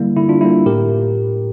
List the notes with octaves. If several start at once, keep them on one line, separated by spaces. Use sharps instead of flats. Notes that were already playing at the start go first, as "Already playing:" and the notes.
Already playing: D3 G3 A#3 E4
D3 E4
D4 F4
G3 A#3 E4
A2 G4 A#4